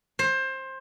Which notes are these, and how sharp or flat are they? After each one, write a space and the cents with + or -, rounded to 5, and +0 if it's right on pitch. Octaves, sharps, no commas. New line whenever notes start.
C5 +20